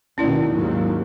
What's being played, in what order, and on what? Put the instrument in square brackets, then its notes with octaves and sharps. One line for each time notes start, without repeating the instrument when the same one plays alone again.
[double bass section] D#2 B2 D#3 [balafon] C#4 E4 D5
[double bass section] D#2 G#2 F#3